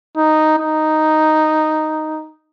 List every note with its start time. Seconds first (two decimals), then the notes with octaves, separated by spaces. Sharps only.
0.17 D#4
0.58 D#4